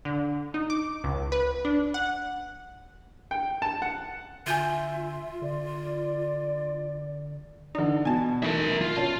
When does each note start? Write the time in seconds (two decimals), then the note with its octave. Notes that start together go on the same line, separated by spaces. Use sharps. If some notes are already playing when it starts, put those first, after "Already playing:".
0.05 D3
0.54 D#4
0.70 D6
1.04 C#2
1.32 B4
1.65 D4
1.94 F#5
3.31 G5
3.62 A5
3.82 F#5
4.46 D3 F4 E5 G#5 G6 D#7
5.42 D3 D5
7.75 D3 E3 D4 D#4
8.05 B2 G#5 A5
8.43 E3 A3 D#4 A#4 E5
8.81 F4
8.97 B2 C#4 A5